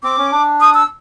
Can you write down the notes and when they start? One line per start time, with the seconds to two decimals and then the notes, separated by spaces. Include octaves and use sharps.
0.03 C4 D6
0.18 C#4
0.32 D4
0.60 D#6
0.74 E6